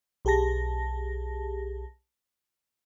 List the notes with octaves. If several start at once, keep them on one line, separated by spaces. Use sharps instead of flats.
B1 G4 G#4 A5 A#6